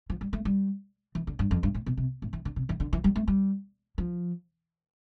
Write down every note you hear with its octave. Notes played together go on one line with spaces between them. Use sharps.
F3
G3
A3
G3
E3
D3
G2
F2
G2
A2
B2
C3
A2
E3
D3
C3
E3
D3
E3
G3
A3
G3
F3